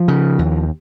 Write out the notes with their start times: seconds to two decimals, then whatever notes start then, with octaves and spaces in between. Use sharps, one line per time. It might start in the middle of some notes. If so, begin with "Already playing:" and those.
Already playing: F3
0.08 C#3
0.39 D#2